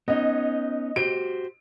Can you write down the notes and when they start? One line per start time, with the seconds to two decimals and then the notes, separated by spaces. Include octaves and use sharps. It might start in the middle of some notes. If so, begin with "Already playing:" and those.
0.08 B3 C#4 D#4 D#5
0.96 F#4 G4 C5 D7